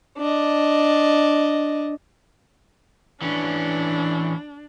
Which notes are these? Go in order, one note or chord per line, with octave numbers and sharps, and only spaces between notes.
D4 D#5
E3 C#4 D4